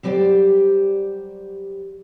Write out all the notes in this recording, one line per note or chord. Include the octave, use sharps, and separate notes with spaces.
F#3 G3 G4 G#4 C5 D5